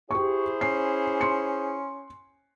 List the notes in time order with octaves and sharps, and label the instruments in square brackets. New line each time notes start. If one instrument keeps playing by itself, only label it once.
[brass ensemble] E4 G#4 C5 [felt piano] G4 C#6
[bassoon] C#4 [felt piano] C7
[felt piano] C6 C#7